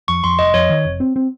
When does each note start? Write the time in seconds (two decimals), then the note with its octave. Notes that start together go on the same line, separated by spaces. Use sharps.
0.08 F2 C#6
0.24 F2 C6
0.39 F1 D#5
0.54 F2 C#5
0.70 D#3
0.85 F1
1.00 C4
1.16 C4